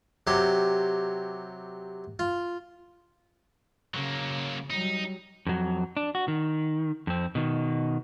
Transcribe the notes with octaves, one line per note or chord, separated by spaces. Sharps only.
C3 F#3 G4 C6
F4
C#3 F#3 A#3
F#3 G3 D#4
F2 F#3
D4
F#4
D#3
F2 C4
B2 D#3